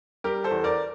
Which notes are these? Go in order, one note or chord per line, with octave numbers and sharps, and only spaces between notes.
G3 G4 A#4
A4 C5
E2
A#4 D5